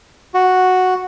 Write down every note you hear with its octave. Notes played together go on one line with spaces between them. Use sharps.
F#4